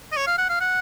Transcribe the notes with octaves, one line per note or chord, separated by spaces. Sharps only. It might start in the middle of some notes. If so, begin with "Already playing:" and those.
D#5
C#5
F5
F#5
F5
F#5